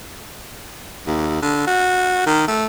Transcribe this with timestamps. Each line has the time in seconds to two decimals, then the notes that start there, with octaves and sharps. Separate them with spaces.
1.07 D#2
1.42 D3
1.67 F#4
2.26 D#3
2.48 A3